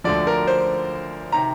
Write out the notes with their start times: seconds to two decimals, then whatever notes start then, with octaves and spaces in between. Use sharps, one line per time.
0.04 D2 D3 F3 D5
0.27 A#4
0.47 C5
1.32 C3 D#3 A#5